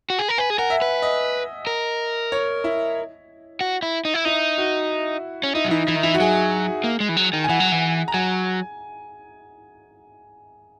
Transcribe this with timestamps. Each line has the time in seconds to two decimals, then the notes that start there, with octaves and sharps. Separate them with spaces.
0.10 F#4
0.19 G#4
0.28 A#4
0.38 B4 G#5
0.50 G#4
0.58 A#4 F#5
0.70 E5
0.82 B4
1.02 D#5
1.67 A#4
2.32 C#5
2.64 E4
3.61 F#4
3.82 E4
4.05 D#4
4.14 E4
4.25 D#4 E4
4.58 F#4
5.44 C#4
5.55 D#4 E4
5.64 F#3
5.71 E3 D#4
5.87 E3 E4
5.96 D#3
6.03 E3 E4
6.14 F#4
6.20 F#3 G#4
6.84 A#3
7.00 G#3
7.09 E3
7.17 F#3
7.33 D#3
7.44 G#5
7.49 E3 F#5
7.60 F#3
7.72 E3
8.08 A#5
8.14 F#3 G#5